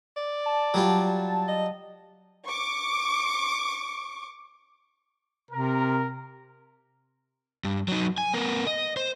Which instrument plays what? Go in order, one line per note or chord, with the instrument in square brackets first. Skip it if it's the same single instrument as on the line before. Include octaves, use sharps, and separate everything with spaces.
[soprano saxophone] D5
[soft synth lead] A5
[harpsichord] F#3 G3 F4
[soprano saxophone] D#5
[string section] C#6 D6
[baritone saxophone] C3 [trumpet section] A#4
[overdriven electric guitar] G2
F#3 D#4
G#5
B3 A#4
D#5
C5